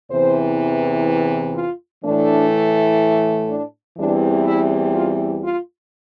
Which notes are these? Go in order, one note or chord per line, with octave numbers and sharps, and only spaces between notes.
E2 C3 E3 C5
F4
A2 E3 A3 D4
D4
E2 E3 G3 C4 D4
E4
F4
F4